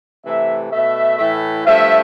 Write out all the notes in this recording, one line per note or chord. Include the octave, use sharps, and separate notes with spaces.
C3 E3 A3 E5
B2 A3 E5
A2 E3 A3
G2 F3 A3 E5